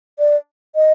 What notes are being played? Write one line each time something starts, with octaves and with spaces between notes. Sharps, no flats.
D5
D#5